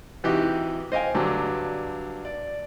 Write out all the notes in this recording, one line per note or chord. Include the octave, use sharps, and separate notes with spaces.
C3 E3 D#4 F#4 G4
C5 D#5 F5 G5 G#5
G2 D3 F#3
D5